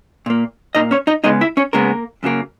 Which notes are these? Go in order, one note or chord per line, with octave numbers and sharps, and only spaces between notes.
A#2 A#3
A#2 A#3 D#4 D#5
C#4 C#5
D#4 D#5
C#3 G#3 B3 D#4 D#5
E4 E5
C#4 C#5
C#3 G#3 A#3 B3 A#4
F#2 C#3 F#3 A#3